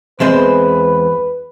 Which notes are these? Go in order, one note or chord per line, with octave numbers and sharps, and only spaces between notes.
E2 G#3 C4 B4